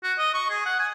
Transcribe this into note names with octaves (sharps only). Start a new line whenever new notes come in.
F#4
D#5
C#6
G#4
F#5
G#5